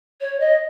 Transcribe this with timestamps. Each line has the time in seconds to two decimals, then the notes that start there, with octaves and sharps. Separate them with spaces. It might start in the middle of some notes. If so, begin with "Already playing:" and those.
0.21 C#5
0.40 D#5